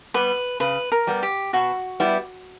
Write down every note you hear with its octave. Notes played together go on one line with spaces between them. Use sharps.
G3 B3 B4
C#3 B4
A#4
G3 B3
G4
B2 F#4
G3 B3 E4